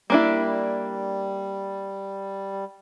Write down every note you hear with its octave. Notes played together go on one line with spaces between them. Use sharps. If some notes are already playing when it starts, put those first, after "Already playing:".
G3 A#3 D4 E4